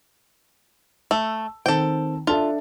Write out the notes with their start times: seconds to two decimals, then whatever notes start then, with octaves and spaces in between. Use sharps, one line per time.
1.11 A3 E6
1.66 D#3 C4 A4 G5
2.27 D4 F4 A4 E5